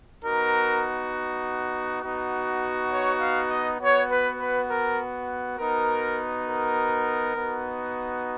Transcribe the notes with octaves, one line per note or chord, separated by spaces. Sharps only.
B3 D#4 F#4 A#4
B3 D#4 F#4
C#5
F5
D#5
B3 F#4 C#5
B4
B4
A#4
B3 D#4 F#4 A#4
A#4
B3 D#4 F#4